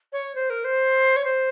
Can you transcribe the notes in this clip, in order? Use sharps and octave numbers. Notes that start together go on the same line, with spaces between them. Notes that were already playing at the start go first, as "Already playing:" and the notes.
C#5
C5
A#4
C5
C#5
C5